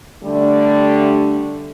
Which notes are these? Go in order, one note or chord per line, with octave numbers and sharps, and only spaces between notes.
D3 G3 A3